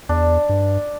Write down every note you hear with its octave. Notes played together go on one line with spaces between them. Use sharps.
E2 D4
G2